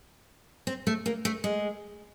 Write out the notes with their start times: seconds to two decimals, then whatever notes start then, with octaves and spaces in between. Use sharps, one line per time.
0.67 C4
0.87 A3
1.06 A#3
1.25 A3
1.44 G#3